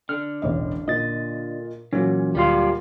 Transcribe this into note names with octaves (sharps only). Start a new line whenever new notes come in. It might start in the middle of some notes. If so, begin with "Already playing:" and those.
D3 F6
E1 A1 D#5
A#2 D#5 A6
A#2 E3 F#3 C#4
D2 G3 F4 F5 C6